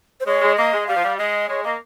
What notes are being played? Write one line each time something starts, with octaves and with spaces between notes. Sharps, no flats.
C5
G#3 C#5
G#3
A#3 D#5
G#3
G3 F5
F3
G3
G#3 D#5
G#3 C#5
A#3 D#5